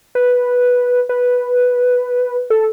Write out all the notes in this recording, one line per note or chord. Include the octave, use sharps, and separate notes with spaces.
B4
B4
A4